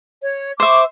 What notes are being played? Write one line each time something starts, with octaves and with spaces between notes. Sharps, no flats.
C#5
C5 E5 C#6 D6